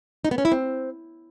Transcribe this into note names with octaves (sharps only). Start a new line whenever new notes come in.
D#4
B3
C#4
E4
C4